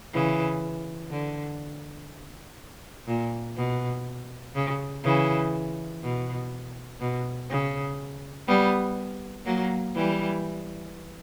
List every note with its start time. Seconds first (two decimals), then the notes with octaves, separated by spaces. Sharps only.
0.13 C#3 E3
1.11 D3
3.07 A#2
3.57 B2
4.55 C#3
5.04 C#3 E3
6.03 B2
7.00 B2
7.50 C#3
8.48 G3 B3
9.46 F#3 A#3
9.95 E3 G3